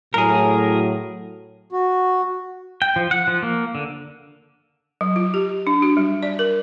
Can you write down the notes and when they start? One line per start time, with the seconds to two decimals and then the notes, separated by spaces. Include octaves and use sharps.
0.14 A2 F#3 G#4 A#4
1.72 F#4
2.82 G5
2.96 F3
3.11 F#5
3.27 F3
3.43 A#3
3.75 D3
5.01 F#3
5.16 F4
5.34 G4
5.67 D4
5.82 F#4
5.97 G3
6.23 D5
6.39 A#4